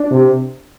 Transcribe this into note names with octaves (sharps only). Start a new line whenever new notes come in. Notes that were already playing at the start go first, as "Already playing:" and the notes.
Already playing: D4
C3